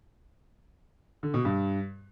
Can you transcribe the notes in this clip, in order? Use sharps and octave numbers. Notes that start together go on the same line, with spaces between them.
D3
B2
G2